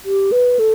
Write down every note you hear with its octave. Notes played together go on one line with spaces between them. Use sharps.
G4
B4
A4